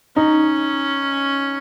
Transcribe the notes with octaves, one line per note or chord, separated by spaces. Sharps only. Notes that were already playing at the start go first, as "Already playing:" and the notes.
C#4 D#4